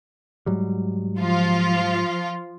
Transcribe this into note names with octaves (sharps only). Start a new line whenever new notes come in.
G#2 F#3 G3
F3 F4